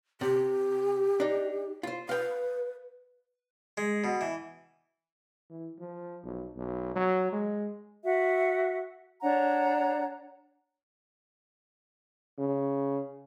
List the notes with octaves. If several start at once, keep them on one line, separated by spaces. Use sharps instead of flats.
C3 G4
D4 D#4
F4 C5
B4 F5 G5
G#3
B2
E3
E3
F3
B1
B1
F#3
G#3
F#4 E5
D4 C#5 F#5 A#5
C#3